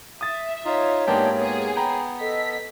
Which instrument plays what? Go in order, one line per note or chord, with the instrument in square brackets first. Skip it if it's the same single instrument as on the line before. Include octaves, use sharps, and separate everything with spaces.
[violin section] E5 [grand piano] D#6 A6
[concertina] D#4 F4 [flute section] C#5
[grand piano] G#2 A#3 G4 [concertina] B3 D4 G5
[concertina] B3 [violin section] G#4
[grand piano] G5 A#5 B5
[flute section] A4 D#5 [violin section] B6